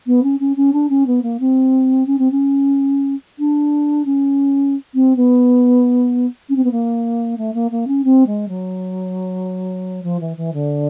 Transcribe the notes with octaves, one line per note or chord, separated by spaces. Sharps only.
B3
C#4
C#4
C#4
D4
C#4
B3
A#3
C4
C#4
C4
C#4
D4
C#4
C4
B3
C#4
C4
B3
A#3
A3
A#3
A#3
C#4
C4
G#3
F#3
F3
E3
E3
D3